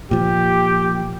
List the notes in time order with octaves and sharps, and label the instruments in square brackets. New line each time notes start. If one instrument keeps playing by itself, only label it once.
[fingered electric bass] A#2 F3 [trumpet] G4